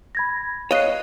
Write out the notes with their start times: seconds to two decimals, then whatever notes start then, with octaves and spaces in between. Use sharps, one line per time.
0.15 B5 G#6 A#6
0.71 C#5 D#5 F5 F#6 C7